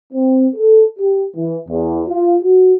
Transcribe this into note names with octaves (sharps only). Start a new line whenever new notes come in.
C4
A4
G4
E3
E2
F4
F#4